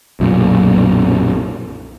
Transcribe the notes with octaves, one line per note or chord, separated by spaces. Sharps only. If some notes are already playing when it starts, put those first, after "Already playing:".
B1 F#2 A#2